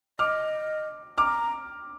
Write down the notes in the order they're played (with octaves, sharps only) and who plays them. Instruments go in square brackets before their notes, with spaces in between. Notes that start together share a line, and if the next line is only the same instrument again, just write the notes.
[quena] D#5 [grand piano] D6 F6
[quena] A#5 [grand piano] D6 F6